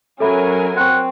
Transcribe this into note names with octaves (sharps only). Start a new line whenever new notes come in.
F#3 C#4 A4 A#4 E5 G#5 B5
C4 F#5 C6 C#6